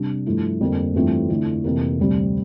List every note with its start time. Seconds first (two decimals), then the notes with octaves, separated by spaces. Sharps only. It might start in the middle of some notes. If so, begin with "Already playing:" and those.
Already playing: C3 G3 D4
0.26 G2 F3 A3 E4
0.61 F2 D3 G3 A#3
0.95 G2 E3 A3 C4 F4
1.29 F2 D3 A3 E4
1.64 F2 C3 E3 A#3
1.99 D2 C3 G3 C4 G4